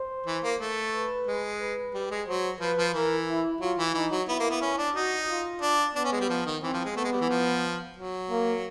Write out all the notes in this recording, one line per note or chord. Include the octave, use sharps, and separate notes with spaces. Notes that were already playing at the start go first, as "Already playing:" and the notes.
Already playing: C5
E3
A#3
A3
B4
G#3
B4
G3
G#3
F#3 C5
F3 B4
F3
E3 A#4
E4
F#3 F4
E3
E3 D#4
F#3
B3 E4
A#3
B3
C#4
D4
D#4 F#4
F4
D4
B3 D4
C#4
G#3
G3
F3
D#3
E3 C4
F3
G#3
A3 B3
G#3
G3
E3
F3
F#3
A#3